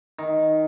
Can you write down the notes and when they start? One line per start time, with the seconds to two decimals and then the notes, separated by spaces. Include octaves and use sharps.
0.18 D#3